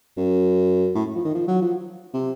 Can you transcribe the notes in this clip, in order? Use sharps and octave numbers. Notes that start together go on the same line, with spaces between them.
F#2
A2
F3
D#3
F3
F#3
F3
C3